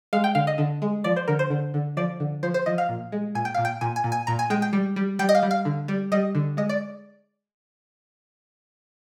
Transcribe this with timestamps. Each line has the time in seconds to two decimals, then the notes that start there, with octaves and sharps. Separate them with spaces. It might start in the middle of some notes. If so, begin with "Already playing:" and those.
0.13 G#3 F5
0.24 G5
0.35 D3 F5
0.47 D#5
0.58 D3
0.82 G#3
1.04 F3 D5
1.16 C5
1.28 D3 A#4
1.39 C5
1.50 D3
1.74 D3
1.97 F3 D5
2.20 D3
2.43 F3 C5
2.54 C5
2.66 F3 D#5
2.78 F5
2.89 A#2
3.12 G#3
3.35 A#2 G#5
3.45 G5
3.54 A#2 F5
3.65 G5
3.81 A#2 G#5
3.96 G#5
4.04 A#2
4.12 G#5
4.27 A#2 A#5
4.39 G#5
4.50 G#3 G5
4.62 G5
4.73 G3
4.96 G3
5.19 G3 G5
5.29 D#5
5.35 F5
5.43 G3
5.51 F5
5.65 D3
5.88 G3
6.12 G3 D#5
6.35 D3
6.57 G#3 D#5
6.69 D5